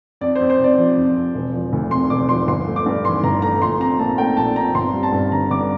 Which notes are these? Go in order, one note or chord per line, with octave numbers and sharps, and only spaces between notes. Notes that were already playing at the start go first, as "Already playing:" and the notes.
F2 D5
C5
F2
C5
C3 D5
F3
F2
F2
E1
F3
D2
C3 C6
E1 D6
F3 C6
G1 C6
A3
D6
G2
E3 C6
G1 A#5
A3 A#5
A#1 C6
C4 A#5
A#2 A5
A3 G5
A#1 A5
C4 A#5
G1 C6
G3
A5
G2
D3 A#5
G1 D6